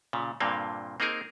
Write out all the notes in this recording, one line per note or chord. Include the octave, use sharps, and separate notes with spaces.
A#2 C#3
G2 A#2 D3 A#3 C4
A#3 C4 D#4 G#4 A#4